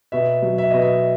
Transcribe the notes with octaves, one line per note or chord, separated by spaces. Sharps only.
B2 E5
F#3
E5
B2 D#5
E5